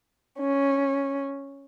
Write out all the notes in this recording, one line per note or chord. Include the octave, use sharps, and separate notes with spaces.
C#4